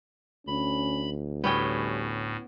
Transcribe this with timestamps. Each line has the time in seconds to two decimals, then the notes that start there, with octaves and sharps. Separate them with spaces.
0.47 D2 C#4 B5
1.44 A2 G3 B3 C#4 G5